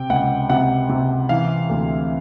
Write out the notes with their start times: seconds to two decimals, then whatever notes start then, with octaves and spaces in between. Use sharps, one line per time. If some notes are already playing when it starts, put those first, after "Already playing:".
Already playing: C3 G5
0.10 C#2 F#5
0.50 C3 F#5
0.89 C3
1.29 E3 F5
1.70 D2